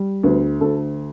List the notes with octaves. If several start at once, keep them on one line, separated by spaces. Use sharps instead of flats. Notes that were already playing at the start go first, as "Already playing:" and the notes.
Already playing: G3
D2 B3
D2 A4